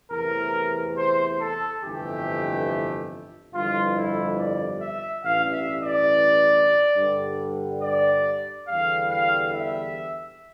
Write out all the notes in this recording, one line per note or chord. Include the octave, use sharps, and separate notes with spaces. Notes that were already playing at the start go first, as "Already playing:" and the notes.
E2 C3 E3 A3 A#4
C5
A4
G1 F2 C3 E3 A3 G4
G1 F2 E3 G3 F4
E4
D5
E5
A1 G2 E3 F5
E5
D5
G2 D3 G3
D5
E2 D3 G3 F5
F5
E5